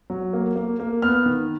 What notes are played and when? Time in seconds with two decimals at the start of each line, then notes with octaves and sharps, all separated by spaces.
0.10 F#3
0.33 A#3
0.56 A#3
0.80 A#3
1.02 B3 F6
1.26 D#3